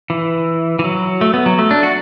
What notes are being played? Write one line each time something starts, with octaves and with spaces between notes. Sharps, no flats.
E3
E3
F#3
A3
B3
F#3
A3
D4
F#4